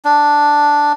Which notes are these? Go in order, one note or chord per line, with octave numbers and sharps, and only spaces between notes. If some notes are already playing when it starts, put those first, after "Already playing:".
D4